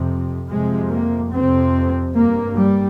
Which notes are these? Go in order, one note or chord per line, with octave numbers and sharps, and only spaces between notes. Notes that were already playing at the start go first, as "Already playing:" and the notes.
Already playing: F2 C3
F2 C3 G#3
A#3
F2 C3 C4
G2 A#3
G3